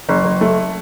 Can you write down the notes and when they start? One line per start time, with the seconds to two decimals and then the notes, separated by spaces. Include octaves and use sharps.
0.09 F#1
0.24 F#1
0.41 A3